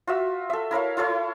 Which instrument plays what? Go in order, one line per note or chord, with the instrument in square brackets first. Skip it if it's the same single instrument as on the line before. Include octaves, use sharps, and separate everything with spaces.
[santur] F4 F#4 E5
A4 E5
E4 A#4 C#5 F5
E4 F4 A4 C#5